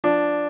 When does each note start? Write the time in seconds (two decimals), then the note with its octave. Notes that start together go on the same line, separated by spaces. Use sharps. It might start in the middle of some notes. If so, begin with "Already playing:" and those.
0.04 F3 D4